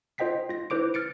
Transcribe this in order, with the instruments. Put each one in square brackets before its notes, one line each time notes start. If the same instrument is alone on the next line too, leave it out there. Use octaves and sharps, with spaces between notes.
[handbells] F4 C5 D#5 G5 B6 C7
F4 A#6
E4 B4 C5 D6 D7
F6 A6 C#7 D7